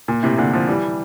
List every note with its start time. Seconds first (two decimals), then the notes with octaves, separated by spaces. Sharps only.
0.08 A#2
0.23 A2 C3
0.38 A#2 D3
0.53 D3 F3
0.68 E3 G3